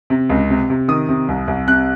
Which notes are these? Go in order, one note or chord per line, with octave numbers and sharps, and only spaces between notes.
C3
C#2
C3
C3
D#3 D#6
C3
C2
C2
C3 F#6